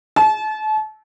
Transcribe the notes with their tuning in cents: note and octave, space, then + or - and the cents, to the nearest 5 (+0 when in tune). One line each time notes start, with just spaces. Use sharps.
A5 -35